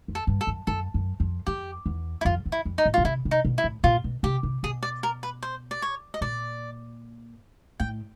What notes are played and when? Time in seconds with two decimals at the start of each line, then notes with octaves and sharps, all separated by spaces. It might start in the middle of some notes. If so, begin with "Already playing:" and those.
0.08 F2
0.15 A4
0.27 G2
0.41 A4
0.47 F#2
0.67 F#2 A4
0.94 F#2
1.20 F2
1.47 F2 G4
1.86 E2
2.21 E4
2.25 F2 F4
2.46 E2
2.52 E4
2.65 F2
2.78 D#4
2.86 A2
2.94 B2 F4
3.05 C3 E4
3.25 C3
3.31 D#4
3.45 B2
3.58 E4
3.64 A2
3.84 A#2 F4
4.04 B2
4.23 C3 G4
4.43 C3
4.63 B2 G#4
4.83 D5
5.03 A#4
5.23 B4
5.42 C5
5.71 D5
5.82 C#5
6.14 D#5
6.21 A#2 D5
7.80 A2 G5